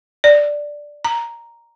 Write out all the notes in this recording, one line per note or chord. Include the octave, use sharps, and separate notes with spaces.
D5
A#5